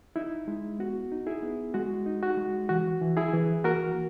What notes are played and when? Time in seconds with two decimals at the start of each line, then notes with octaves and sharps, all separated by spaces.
0.16 D#4 E4
0.47 G#3 E4
0.79 B3 F#4
1.12 D#4
1.27 E4 G#4
1.42 B3
1.74 G#3 F#4
2.06 D#4
2.23 F#4
2.37 G#3
2.69 E3 F#4
3.01 E3
3.17 E4 G#4
3.33 E3
3.64 A#3 F#4 A#4